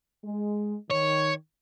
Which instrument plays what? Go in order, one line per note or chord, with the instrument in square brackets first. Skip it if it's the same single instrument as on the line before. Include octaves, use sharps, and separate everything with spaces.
[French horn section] G#3
[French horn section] D#3 [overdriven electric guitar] C#5